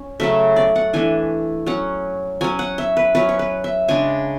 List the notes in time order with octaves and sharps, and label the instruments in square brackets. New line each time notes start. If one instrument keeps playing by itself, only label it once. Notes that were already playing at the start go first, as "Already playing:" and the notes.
Already playing: [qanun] C#4
C#3 F#3 A3 E5
D5
F#5
E3 A3 D4 G#5
F#3 C#4 F#5
F#3 C#4 G#5
F#5
E5
B4
F#3 C#4 B4
C#5
B4
E5
C#3 G#3 D4 G#5